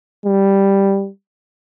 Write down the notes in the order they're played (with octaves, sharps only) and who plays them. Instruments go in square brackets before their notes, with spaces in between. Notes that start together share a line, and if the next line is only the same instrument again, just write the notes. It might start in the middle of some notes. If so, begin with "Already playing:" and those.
[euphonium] G3